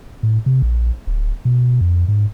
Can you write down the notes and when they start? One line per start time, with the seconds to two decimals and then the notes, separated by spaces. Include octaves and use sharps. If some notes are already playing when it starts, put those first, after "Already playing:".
0.23 A2
0.46 C3
0.62 A#1
1.07 D1
1.45 B2
1.81 F2
2.08 G#2